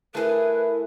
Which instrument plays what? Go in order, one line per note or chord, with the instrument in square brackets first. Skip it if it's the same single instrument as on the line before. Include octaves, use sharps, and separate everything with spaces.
[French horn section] A2 E4 [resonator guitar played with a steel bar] A3 G#4 [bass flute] A#4 [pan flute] B4